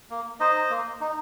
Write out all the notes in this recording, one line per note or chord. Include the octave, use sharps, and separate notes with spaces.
A#3
D#4 C5 D#5
A#3
D#4